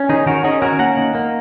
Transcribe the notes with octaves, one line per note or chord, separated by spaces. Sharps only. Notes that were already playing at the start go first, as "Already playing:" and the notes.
Already playing: C#4
D#3 D#4 G#4
D#3 F#4 A#4
C#4 D#4 G#4
C#4 F#4 A#4
A#3 F#5 A#5
D#3
A#3